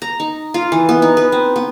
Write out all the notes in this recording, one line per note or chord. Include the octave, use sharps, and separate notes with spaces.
A#5
D#4
F4
E3
B3
D#4
B4
C4
B3